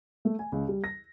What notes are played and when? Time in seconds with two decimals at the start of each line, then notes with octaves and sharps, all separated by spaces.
0.25 A3
0.39 G#5
0.52 C#2
0.68 G3
0.84 A#6